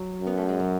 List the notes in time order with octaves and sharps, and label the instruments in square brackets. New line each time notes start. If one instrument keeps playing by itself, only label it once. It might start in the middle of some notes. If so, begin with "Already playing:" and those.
Already playing: [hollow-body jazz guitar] F#3
[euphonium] F#2
[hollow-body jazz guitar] B3
A3
G#3
F#3